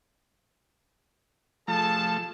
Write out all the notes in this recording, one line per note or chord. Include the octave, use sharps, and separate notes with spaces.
F3 A3 G#4 A4 A5